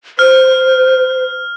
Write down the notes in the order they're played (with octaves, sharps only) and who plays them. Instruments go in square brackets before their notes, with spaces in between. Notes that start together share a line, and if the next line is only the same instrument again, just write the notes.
[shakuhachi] C5 [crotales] F6